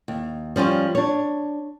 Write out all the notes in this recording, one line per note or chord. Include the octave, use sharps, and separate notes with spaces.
D#2
F3 G3 C#4 F4
D4 C#5